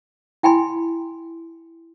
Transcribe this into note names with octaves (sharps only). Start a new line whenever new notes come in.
E4 G5 G#5 B5 C6